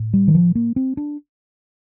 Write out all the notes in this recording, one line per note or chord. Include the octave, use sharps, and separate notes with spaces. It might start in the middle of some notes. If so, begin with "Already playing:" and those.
Already playing: A2
G3
D#3
F3
A#3
C4
D4